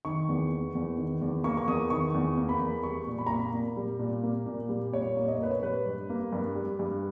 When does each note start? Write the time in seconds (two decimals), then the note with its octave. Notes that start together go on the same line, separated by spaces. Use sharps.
0.05 D#3 C#6
0.29 E2
0.51 A#3
0.75 E2
0.98 D#3
1.22 E2
1.44 A#3 C#6
1.57 C#6
1.68 E2 D#6
1.90 D#3 C#6
2.14 E2
2.37 A#3
2.49 B5
2.60 E2
2.83 G3 C#6
3.07 A#2
3.19 B5
3.27 A#5
3.30 A#3 B5
3.54 A#2
3.77 G3
3.99 A#2
4.23 A#3
4.46 A#2
4.69 G3
4.93 A#2 C#5
5.17 A#3
5.28 D#5
5.35 C#5
5.39 A#2 B4
5.51 C#5
5.62 G3 B4
5.86 G2
6.10 A#3
6.33 G2
6.55 G3
6.79 G2